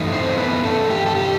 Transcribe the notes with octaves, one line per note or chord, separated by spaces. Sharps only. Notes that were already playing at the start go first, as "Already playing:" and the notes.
Already playing: G2 E3 A3 D#4
C4 C5
B3 B4
A3 A4
G4
A4
G4